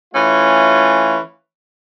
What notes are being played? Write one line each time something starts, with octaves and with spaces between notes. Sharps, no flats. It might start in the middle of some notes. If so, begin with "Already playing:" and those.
E3 A3 C#4 F4